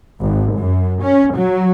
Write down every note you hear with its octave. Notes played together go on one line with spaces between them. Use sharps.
G#1
F#2
C#4
F#3